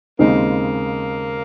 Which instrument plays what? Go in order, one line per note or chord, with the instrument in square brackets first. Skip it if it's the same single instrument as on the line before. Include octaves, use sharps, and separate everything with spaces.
[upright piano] D#2 C#3 G#3 C4 D#4 [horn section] A#3